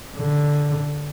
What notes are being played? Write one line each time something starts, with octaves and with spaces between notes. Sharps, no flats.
D3